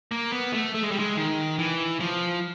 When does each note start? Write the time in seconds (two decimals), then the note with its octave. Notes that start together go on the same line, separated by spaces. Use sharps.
0.12 A#3
0.32 B3
0.53 A3
0.75 A3
0.83 G#3
0.91 G3
0.99 G#3
1.17 D#3
1.59 E3
2.00 F3